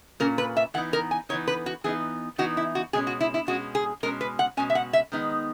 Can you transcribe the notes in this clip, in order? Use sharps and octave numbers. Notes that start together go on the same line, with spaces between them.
A#2 A#3 C#4 A#4
B4
E5
E3 B3 D#4 F#5
A#4
G#5
E3 B3 D#4 C#5
B4
F#4
E3 B3 D#4 G#4
E3 B3 D#4 F#4
E4
F#4
B2 G#3 C#4 G#4
F#4
E4
E4
B2 G#3 C#4 F#4
G#4
B2 G#3 C#4 A#4
B4
F#5
B2 G#3 C#4 G#5
E5
F#5
E5
D#3 G#3 B3 D#4